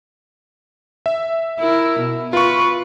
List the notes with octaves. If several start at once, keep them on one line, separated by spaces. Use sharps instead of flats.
E5
E4 A#4
B2
F4 B4 C#6